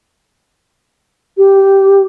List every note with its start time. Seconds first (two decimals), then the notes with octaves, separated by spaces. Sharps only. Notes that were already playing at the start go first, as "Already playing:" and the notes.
1.38 G4